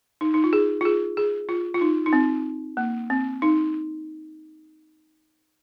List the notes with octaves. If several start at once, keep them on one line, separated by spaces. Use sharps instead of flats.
D#4
D#4
F4
G#4
F4
G#4
G#4
F4
F4
D#4
D#4
C4
A#3
C4
D#4